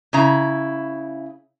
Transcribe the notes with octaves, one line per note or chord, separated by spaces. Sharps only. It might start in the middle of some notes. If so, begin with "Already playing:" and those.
C#3 E4 A#5